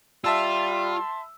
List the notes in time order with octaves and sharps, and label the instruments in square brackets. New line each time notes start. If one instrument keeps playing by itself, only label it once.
[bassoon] G3 [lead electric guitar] F4 [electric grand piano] E5 A5 E6 [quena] C6